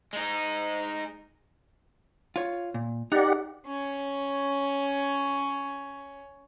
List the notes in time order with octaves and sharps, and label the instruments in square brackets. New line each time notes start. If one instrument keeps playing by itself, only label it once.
[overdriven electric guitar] G#3 D#4
[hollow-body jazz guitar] F4 C#5
A#2
[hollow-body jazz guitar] D#4 A#4 [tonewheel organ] G4 D5 F#5
[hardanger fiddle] C#4 C#5